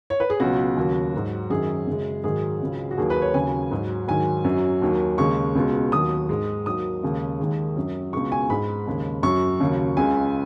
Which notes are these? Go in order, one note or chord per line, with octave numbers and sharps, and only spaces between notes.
C#5
B4
G#4
C#2 B2 F#3 F#4
D#2 C#3 F#3
G#2 F#3
F#2 D#3 F#3 G#4
F#2 C#3 G#3
G#2 D#3 F#3 G#4
C#2 C#3 F#3
F#4
D#2 D#3 F#3 G#4
B4
C#5
D#2 C#3 F#3 G#5
G#2 F#3
G#2 D#3 F#3 G#5
F#2 F#3
D#2 D#3 F#3
D#2 C#3 G#3 C#6
C#2 B2 G#3
D#2 D#3 F#3 D#6
G#2 G#3
D#2 D#3 F#3 D#6
D#2 C#3 G#3
D#2 D#3 G#3
F#2 F#3
C#2 B2 G#3 C#6
G#5
G#2 G#3 B5
D#2 C#3 G#3
F#2 F#3 C#6
D#2 C#3 F#3
C#2 C#3 G#3 G#5